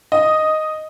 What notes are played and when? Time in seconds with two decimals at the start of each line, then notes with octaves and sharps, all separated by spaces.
0.12 D#5